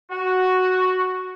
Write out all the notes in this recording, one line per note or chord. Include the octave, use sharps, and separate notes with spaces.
F#4